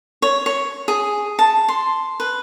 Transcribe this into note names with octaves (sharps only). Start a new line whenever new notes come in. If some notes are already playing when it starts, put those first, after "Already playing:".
C#5
C#5
G#4
A5
C6
B4